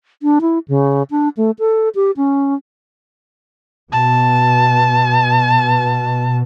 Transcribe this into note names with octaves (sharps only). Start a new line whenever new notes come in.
D4
E4
C#3
D4
A3
A4
G4
C#4
B2 A5